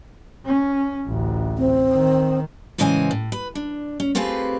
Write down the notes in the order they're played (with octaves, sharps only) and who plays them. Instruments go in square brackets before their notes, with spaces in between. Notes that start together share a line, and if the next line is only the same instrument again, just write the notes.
[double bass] C#4
A1 D2
[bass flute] C4
[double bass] D#3
[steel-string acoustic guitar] A2 C#3 E3 G#3 C5 G#5
A2
B4
D4
C#4
A3 C4 F4 G4 G#4 B4